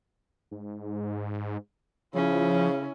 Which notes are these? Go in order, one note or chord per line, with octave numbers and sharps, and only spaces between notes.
G#2
C#3 F3 C#4 E4